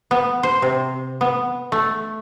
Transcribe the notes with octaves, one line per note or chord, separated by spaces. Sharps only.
B3
C5
C3
B3
A3